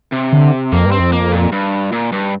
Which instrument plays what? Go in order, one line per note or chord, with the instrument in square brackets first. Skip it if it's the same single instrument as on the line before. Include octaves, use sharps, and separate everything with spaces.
[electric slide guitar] C3
[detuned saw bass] D3
[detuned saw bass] F2 [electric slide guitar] A#3
[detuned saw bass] G2
[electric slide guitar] C4
[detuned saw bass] F2
[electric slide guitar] A#3
A#2
G2
A#2
G2